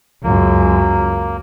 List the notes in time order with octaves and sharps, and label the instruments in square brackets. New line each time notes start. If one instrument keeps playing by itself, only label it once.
[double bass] C#2 F#2 [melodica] A#3